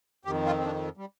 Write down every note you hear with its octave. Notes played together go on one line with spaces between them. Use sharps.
F2 D#3 G4
F4
C4
D4
G3